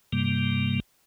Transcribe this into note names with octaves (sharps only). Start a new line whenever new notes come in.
G2 C3 G3 A#3